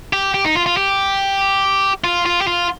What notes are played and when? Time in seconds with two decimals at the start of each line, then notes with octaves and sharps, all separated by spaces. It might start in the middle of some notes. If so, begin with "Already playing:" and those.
0.13 G4
0.34 G4
0.45 D#4
0.55 F4
0.66 F4
0.77 G4
2.04 F4
2.26 F4
2.41 G4
2.47 F4